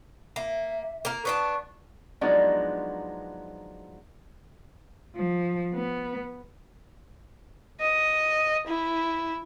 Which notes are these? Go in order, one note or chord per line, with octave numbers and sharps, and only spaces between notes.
A#3 E5
A#3 A#4
B3 D4 A5 C#6
F3 F#3 G#3 B3 D4 D#4
F3
B3
D#5
E4